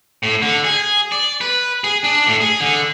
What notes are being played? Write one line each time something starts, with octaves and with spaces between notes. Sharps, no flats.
A2
D3
G#4
D5
B4
G#4
D4
A2
G#4
D3